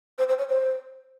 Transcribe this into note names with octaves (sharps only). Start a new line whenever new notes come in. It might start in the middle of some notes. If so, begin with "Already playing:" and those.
C5
C5
C#5
C5